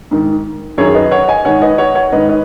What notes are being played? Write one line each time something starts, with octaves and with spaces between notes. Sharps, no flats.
G#2 D#3
F#2 D#3 G#4 C#5
B4 D#5
C#5 F#5
D#5 G#5
G#2 D#3 C#5 F#5
B4 D#5
C#5 F#5
C#5 F#5
G#2 D#3 B4 D#5
B4 D#5